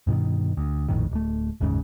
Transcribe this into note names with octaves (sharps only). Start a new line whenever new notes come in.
G2 B2 D3 D#3
D2
A#1 F2 A2 D#3
D1 A3
F#1 D#2 G#2 C#3